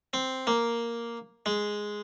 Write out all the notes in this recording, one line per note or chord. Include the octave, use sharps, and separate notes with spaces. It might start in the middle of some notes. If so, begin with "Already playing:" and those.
C4
A#3
G#3